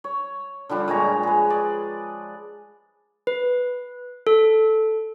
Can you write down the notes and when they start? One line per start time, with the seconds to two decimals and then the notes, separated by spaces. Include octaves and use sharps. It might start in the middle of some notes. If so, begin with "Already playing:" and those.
0.04 C#5
0.69 D3 F3 G3 D4
0.88 A#2 G#3 C#5 A#5
1.23 G#4 B4
1.50 D5
3.27 B4
4.27 A4